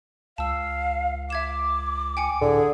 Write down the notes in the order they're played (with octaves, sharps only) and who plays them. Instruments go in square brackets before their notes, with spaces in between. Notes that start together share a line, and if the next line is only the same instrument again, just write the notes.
[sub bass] C#2 [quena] F5 [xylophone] A5 E6
[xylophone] E5 G#6 E7 [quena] D6
[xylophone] G5 G#5 C#7
[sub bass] A2 [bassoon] D3 [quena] G#4